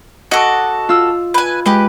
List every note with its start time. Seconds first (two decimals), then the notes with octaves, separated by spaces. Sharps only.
0.31 F#4 A4 D#5 D6
0.89 F4 E6
1.34 B4 G#5
1.66 G#3 G4 B4